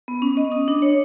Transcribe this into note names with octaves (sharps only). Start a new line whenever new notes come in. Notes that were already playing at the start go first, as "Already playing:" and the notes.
B3
C#4
D#5
D#6
D4
C#5